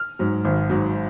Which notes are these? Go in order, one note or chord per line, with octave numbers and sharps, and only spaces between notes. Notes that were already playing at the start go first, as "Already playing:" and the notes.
Already playing: F6
G#2 F#3
G#1
G#2 F#3